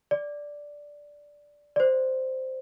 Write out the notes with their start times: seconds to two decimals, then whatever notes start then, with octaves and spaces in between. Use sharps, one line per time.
0.11 D5
1.76 D5
1.80 C5